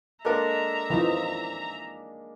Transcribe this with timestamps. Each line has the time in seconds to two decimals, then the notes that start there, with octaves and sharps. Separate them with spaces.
0.25 G#3 A#3 D4 A4 A#4 E5 A#5
0.90 E3 F3 D#4